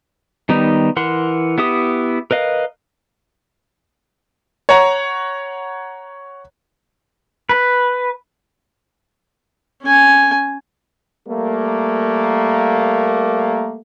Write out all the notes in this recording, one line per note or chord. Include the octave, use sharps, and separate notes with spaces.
D#3 G3 B3 D#4
E3 A#4 F#5 C6
B3 E4 G4 D#6
A#4 B4 D#5 F5
C#5 F#5 A#5
B4
C#4 G#5
G3 A3 A#3